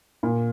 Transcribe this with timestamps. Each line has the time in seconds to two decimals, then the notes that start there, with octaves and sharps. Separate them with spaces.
0.23 A#2